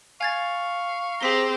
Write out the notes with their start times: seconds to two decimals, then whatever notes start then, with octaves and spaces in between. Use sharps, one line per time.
0.21 F5 G#5 C#6 G#6 A6
1.21 C4 G4 G#4 C5 A#5 B6 G7